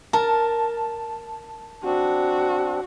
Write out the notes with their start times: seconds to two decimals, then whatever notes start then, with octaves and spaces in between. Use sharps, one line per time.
0.13 A#4 A5
1.84 C4 D4 F#4